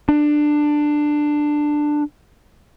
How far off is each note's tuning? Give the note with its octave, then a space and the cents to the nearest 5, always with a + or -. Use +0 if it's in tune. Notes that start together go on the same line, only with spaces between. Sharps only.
D4 +15